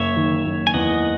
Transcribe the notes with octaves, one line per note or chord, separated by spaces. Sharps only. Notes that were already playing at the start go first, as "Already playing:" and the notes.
Already playing: F#1 C#5 E5
D#3
F#1
G#5
E2 D#5 F#5